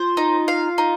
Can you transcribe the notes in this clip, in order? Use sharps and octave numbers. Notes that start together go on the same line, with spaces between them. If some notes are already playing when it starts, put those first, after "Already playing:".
Already playing: F4 C5
D#4
F5
D#4